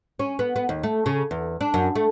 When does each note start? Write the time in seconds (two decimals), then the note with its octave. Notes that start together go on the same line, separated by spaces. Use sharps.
0.19 C#4
0.39 B3
0.56 B3
0.69 D#2
0.83 A3
1.06 C#3
1.31 E2
1.61 D4
1.74 F#2
1.95 A3